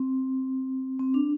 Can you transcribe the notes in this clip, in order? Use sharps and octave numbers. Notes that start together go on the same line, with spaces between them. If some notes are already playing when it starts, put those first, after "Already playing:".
Already playing: C4
C4
D4